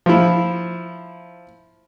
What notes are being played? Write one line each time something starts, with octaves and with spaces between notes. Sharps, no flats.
F3 E4